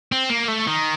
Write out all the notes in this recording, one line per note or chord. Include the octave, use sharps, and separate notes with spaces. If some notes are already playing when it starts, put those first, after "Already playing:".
C4
A#3
A3
D#3